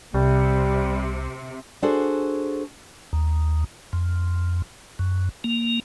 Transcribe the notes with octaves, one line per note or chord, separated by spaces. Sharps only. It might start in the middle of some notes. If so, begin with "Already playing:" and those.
C2 C3 G3
D4 F#4 G#4 A4 C5
D#2
F2
F#2
A#3